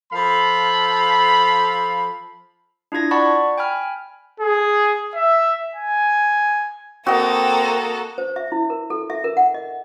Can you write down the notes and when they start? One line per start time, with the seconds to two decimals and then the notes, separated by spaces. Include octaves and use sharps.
0.13 F3 A4 F5 B5
2.92 D4 E4 F4 G#6 A#6
3.11 D5 F#5 A5 B5 C#6
3.58 G5 G#5 B5 F6
4.40 G#4
5.15 E5
5.75 G#5
7.06 A#3 C4 F#4 A4 D#5
8.18 C5
8.36 E5
8.52 E4
8.70 A#4
8.90 A4
9.10 E5
9.24 A#4
9.37 F#5
9.54 D#5